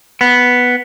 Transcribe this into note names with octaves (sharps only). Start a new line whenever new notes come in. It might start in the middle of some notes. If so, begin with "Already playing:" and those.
B3